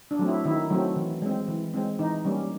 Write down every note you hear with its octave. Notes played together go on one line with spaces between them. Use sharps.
D4
F#3 A3 C4
E4
D#3 E4
F#3 A3 C4
E3
G#3 C4
E3
G#3 C4
E3 D#4
G3 A#3 C#4